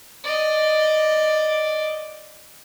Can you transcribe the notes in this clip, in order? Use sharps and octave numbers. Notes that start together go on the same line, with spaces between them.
D5 D#5